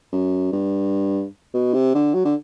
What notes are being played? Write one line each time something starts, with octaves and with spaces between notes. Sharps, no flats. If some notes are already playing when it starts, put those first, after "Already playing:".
F#2
G2
B2
C3
D3
F#3
D3